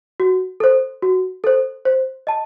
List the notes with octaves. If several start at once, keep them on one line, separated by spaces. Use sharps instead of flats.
F#4
A4 C5
F#4
A4 C5
C5
D#5 A5